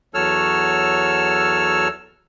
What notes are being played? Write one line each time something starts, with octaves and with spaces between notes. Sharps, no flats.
E2 F#3 A4 C#5 E6 F6